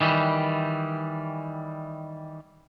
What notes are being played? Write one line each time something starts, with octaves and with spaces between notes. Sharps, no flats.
D#3 E3 G3